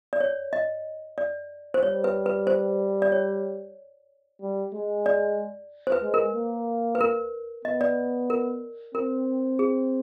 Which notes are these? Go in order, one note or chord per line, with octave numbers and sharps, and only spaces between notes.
D5
C#5
D#5
D5
C5
G3 C#5
B4
B4
C5
D5
C#5
G3
G#3
D5
C5
B4
G#3
A#4
A#3
B4
A#4
B3 D#5
D5
A#4
C4 A#4
G#4